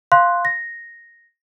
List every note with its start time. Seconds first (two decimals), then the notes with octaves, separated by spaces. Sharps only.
0.12 F5 C6 F#6
0.45 A#6